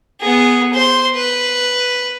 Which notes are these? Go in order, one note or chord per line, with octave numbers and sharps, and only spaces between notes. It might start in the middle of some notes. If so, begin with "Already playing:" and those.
B3 G#4
C5 C6
B4